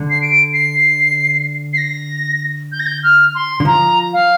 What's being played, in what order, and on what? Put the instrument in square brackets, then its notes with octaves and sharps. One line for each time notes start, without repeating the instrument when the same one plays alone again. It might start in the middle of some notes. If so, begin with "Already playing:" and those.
Already playing: [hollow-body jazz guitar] D3
[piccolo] C7
D7
C7
C7
A#6
G6
A#6
G6
F6
C6
[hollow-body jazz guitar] D3
[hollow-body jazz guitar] F3 [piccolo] A#5
[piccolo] F5